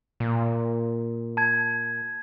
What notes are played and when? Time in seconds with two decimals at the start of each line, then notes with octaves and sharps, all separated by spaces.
0.20 A#2
1.37 A5 G#6